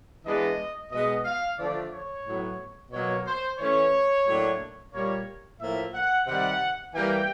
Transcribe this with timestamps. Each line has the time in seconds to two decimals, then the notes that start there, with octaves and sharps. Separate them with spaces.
0.25 E3 G#3 B3 D4 D#5
0.91 B2 G#3 B3 D#5
1.25 F5
1.58 D3 F3 A3 D4 D5
1.92 C#5
2.25 A2 F#3 B3
2.91 B2 F#3 A#3 C#5
3.26 C5
3.59 E3 A3 C#4 C#5
4.26 A2 F#3 A#3 D4
4.92 A#2 G3 A#3 C#5
5.59 A2 F3 A#3 E5
5.94 F#5
6.26 C3 D#3 G3 F#5
6.93 E3 G3 A#3 G5